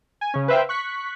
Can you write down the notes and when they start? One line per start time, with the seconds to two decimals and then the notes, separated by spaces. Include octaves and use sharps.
0.21 G#5
0.34 C#3 C#4
0.48 B4 C5 E5 F5 G5
0.69 C#6 F#6 B6